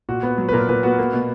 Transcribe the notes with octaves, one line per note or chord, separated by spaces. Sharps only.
A#2 F#4
B3
F#3
B4
A#2 A#4
A#2 B4
B3 F#4
A#3
B2